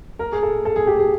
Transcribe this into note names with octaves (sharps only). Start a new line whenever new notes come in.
A#4
G#4
A4
A4
G#4
G4
G#4